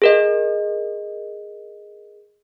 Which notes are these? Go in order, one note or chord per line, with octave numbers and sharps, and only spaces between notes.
G#4 A#4 D#5